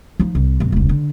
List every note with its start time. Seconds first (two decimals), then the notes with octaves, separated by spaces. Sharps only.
0.19 F3 D#4
0.35 C2
0.60 F#2 B2
0.72 E1 C#2
0.89 D3